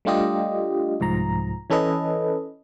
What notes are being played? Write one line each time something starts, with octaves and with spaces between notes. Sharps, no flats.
G3 A3 D4 F4 G4 D#5
C2 G#2 F3 A#5
E3 C#4 A4 B4 D#5